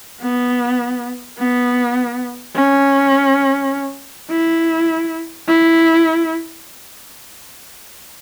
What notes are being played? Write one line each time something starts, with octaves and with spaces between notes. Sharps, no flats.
B3
B3
C#4
E4
E4